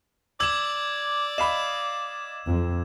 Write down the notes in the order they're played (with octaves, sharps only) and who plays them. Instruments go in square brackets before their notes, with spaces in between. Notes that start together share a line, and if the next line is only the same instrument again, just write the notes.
[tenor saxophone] D5 [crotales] D6 E6 G#6 [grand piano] E7 F#7
[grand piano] D#5 F5 B5 [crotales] E7
[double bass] F2